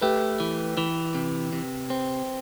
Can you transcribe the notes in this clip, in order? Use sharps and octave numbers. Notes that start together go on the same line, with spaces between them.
A3 G4 B4
E3
E3
C3
C3
C4